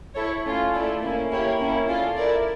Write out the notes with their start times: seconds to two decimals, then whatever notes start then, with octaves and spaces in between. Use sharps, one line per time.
0.15 E4 A4 C#5
0.44 A3 C#4 F4
0.73 A3 E4 A4 D5
1.01 A#3 C#4 E4
1.30 A#3 E4 G4 C#5
1.59 A#3 C#4 E4
1.88 C#4 F4 A4 D5
2.17 E4 A#4 D5